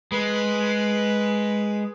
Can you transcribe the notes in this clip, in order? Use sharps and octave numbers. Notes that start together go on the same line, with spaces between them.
G#3 B4